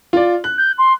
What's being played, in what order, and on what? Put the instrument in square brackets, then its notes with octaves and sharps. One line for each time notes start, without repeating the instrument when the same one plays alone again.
[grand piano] F4 D5
F#6
[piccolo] G6
C6